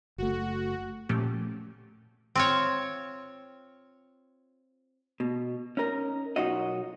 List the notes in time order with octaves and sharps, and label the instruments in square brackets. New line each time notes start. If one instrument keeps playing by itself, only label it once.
[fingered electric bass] F#1 A3 [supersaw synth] F#4
[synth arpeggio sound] A#2 F3 A3 C#4 G4
[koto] C4 F4 C#5
[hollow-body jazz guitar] B2
C#4 D#4 A#4
B1 D#4 F4 F#4 C#5 D#5